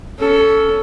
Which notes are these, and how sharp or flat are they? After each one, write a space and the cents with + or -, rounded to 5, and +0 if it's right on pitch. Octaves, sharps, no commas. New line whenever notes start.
C#4 +20 A4 +0